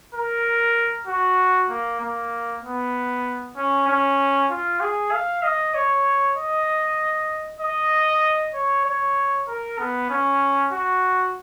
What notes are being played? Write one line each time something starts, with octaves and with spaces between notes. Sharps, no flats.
A#4
F#4
A#3
A#3
B3
C#4
C#4
F4
G#4
F5
D#5
C#5
D#5
D#5
C#5
C#5
A#4
B3
C#4
F#4